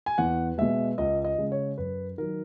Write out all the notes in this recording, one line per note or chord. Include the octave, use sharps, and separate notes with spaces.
G#5
E2 F#5
B2 G#3 E5
C#2 D#5
D#5
C#3 G#3
C#5
F#2 B4
D#3 F#3 A#4